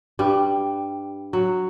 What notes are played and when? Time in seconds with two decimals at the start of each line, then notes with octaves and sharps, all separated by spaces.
0.19 G2 G3
1.33 F#3